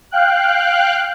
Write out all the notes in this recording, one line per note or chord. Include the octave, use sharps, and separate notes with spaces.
F5 G5 F#6